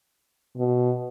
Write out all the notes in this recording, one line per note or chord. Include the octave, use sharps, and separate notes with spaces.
B2